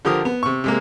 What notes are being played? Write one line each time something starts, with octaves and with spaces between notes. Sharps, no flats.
D3 F3 G4 A#4 D#6
B3
C3 C#6
C3 G#3 A#3